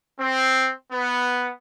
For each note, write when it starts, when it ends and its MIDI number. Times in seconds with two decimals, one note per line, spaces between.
0.20 0.73 60
0.92 1.52 59